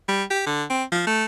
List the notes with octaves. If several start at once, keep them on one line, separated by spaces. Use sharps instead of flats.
G3
G4
D3
C4
F3
A3